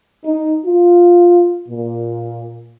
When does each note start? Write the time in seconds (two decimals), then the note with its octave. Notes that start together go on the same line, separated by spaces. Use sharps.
0.24 D#4
0.66 F4
1.69 A#2